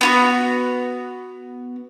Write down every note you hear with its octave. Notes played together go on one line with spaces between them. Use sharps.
B3 F4 F#4